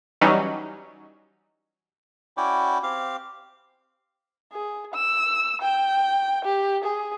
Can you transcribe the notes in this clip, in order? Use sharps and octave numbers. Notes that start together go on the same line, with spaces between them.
E3 F#3 G3 C#4 D#4
C#4 E4 F#4 D5 G5
C4 G4 F5
G#4
E6
G5
G4
G#4